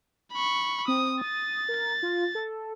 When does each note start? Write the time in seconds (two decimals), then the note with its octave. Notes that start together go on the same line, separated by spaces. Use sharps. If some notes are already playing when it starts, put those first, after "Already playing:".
0.33 B5 C#6
0.88 C4 D#6
1.22 D#6 A6
1.69 A#4
2.03 F4
2.35 A4